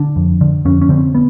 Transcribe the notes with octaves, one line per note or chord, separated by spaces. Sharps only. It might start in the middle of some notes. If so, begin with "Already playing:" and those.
Already playing: D3 D4
F2
D3
F2 C#4
C#4
D3 C4
B3